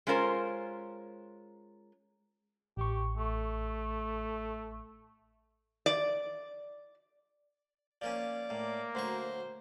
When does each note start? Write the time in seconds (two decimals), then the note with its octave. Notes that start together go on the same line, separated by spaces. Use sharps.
0.07 G#3 C#4 F4 A#4 C5
2.77 A1 G4 C#6
3.17 A3
5.86 D5
8.02 F3 A#3 C#4 D5
8.50 A2 A#3
8.95 D2 F#3 C5 C#6